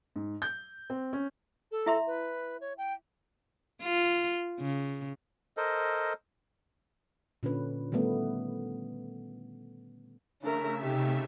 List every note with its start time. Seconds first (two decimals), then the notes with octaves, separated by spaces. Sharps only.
0.16 G#2
0.42 G6
0.90 C4
1.13 C#4
1.71 A4
1.86 E4 E5 C6
2.07 B4
2.61 C#5
2.78 G5
3.82 F4
4.60 C#3
5.57 A4 A#4 C5 D#5
7.43 A#2 D3 C#4 B4
7.92 D#3 G3 A3 B3
10.42 C#3 A3 D4 A#4 E5
10.81 C3 D#4 G4